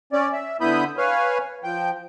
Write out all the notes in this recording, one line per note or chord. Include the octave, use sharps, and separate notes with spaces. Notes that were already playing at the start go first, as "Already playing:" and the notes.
C#4 D5
E5
D3 B3 E4 B5 D#6 G6
B4 C#5 F5 G#5
F3 G5